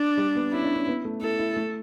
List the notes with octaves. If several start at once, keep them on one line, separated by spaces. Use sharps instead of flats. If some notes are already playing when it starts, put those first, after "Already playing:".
Already playing: D4
G3
B3
C#4 E4
D4
C#4
B3
A3
E4 A4
E4
A3